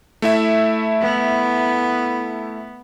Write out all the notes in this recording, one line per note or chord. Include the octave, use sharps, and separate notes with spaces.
A3 E4 E5
B3